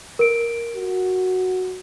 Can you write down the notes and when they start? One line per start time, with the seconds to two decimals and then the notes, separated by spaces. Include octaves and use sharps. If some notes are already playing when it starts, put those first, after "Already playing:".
0.19 A#4 D7
0.76 F#4